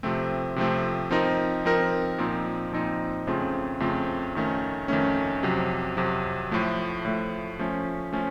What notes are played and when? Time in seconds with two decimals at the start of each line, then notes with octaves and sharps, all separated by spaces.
0.03 C3 F3 A3 C4
0.56 C3 F3 A3 C4
1.11 F3 C4 D#4 A#4
1.65 F3 C4 D#4 A#4
2.18 A#2 F3 C4 D#4
2.73 A#2 F3 C4 D#4
3.27 F2 C#3 A3 C4 F4
3.80 F2 C#3 A3 C4 F4
4.35 F2 D#3 A3 C#4
4.88 F2 D#3 A3 C#4
5.43 F2 C3 F#3
5.97 F2 C3 F#3
6.51 A2 F3 A3
7.05 A2 F3 A3
7.59 F3 A3 C#4
8.13 F3 A3 C#4